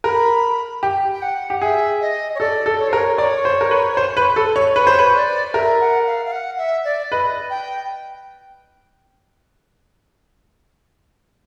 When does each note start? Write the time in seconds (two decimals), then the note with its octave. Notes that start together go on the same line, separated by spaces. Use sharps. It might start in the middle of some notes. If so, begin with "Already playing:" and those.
0.04 A#4 B5
0.83 G4
1.13 G5
1.22 F#5
1.50 G4
1.61 G#4 E5
2.01 D#5
2.35 C#5
2.40 A4 D5
2.66 A4
2.79 C#5
2.89 A#4 C5
2.97 C#5
3.18 C#5 D5
3.45 C5
3.61 A#4
3.71 B4
3.97 C5
4.17 B4
4.36 A4
4.56 C#5
4.76 B4 C#5
4.87 C5
4.99 B4
5.15 D5
5.54 A#4 E5
5.80 F#5
6.06 F5
6.25 F5
6.32 F#5
6.58 E5
6.85 D5
7.11 B4 D#5
7.50 G5